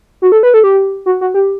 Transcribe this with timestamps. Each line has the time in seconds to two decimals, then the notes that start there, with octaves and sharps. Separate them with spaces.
0.22 F#4
0.32 A4
0.43 B4
0.54 A4
0.64 G4
1.06 F#4
1.21 F#4
1.34 G4